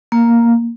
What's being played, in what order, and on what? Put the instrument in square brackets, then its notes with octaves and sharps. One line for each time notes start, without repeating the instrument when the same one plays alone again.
[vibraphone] A#3